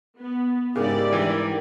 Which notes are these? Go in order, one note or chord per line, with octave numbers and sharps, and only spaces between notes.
B3
G#2 C#3 E4 G4 A#4 D5
E3 G3